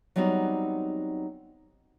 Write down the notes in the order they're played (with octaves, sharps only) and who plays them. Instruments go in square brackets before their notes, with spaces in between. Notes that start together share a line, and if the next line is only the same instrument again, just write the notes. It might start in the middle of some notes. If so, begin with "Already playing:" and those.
[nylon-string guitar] F#3 G3 B3 C4 D#4 F#4